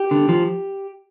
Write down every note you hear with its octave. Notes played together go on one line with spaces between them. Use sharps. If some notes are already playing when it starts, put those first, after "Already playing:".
Already playing: G4
D3
F3